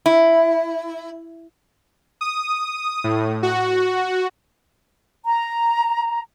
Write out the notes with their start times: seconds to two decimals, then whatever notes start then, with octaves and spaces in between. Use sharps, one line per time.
0.06 E4
2.21 D#6
3.04 A2
3.43 F#4
5.24 A#5